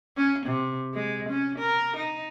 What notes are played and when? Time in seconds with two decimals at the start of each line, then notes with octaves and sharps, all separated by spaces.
0.17 C#4
0.46 C3
0.94 G#3
1.29 C#4
1.59 A#4
1.97 D#4